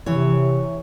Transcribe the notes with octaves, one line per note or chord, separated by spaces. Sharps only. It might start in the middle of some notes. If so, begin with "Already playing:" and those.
C3 E3 C#5